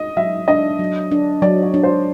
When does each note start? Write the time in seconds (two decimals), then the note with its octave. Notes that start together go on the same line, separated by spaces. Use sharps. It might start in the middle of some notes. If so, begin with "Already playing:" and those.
Already playing: D#5
0.17 F#3 E5
0.48 D4 D#5
0.79 F#3
1.11 D4
1.42 F#3 D5
1.63 C#5
1.74 D4
1.83 C5